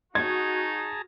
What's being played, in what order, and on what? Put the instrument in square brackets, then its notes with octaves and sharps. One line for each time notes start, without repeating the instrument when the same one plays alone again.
[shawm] D#4 [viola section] F#4 [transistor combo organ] G#4 A5 A#5 [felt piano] G#6